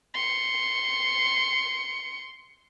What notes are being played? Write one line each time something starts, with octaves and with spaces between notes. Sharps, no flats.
C6 C#7